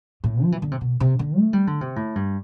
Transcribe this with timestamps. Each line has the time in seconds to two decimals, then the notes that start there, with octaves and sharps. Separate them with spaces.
0.24 A2
0.43 F3
0.52 E3
0.62 D3
0.71 C3
0.81 B2
1.00 C3
1.19 D3
1.38 A3
1.53 G3
1.67 D3
1.81 C3
1.96 A2
2.15 G2